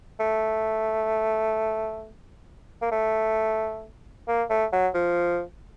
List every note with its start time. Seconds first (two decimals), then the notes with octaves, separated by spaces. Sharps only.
0.20 A3
2.82 A#3
2.92 A3
4.28 A#3
4.50 A3
4.73 F#3
4.94 F3